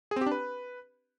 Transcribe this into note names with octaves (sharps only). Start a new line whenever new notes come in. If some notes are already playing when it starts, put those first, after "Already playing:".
G#4
C4
G4
D4
B4